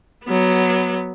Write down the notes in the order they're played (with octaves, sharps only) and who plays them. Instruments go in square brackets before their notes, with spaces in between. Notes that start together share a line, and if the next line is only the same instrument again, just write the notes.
[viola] F#3 B3